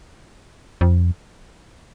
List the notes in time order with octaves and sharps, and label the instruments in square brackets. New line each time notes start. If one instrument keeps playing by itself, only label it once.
[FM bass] F2